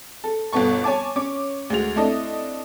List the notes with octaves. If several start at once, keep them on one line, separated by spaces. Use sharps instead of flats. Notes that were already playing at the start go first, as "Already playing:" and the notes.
A4
G1 B2 B3 A4 C#6
C#5 G#5 A5 D6
C#4 C#5 D6
D2 G#3 F#4 F7
A3 C4 D4 E4 A4 D#5